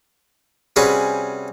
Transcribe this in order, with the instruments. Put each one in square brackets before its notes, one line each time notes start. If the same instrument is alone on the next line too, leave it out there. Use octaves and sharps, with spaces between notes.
[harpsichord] C3 G3 C#4 F#4 G#4 B4